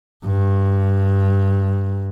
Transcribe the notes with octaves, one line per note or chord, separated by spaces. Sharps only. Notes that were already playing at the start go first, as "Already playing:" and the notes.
G2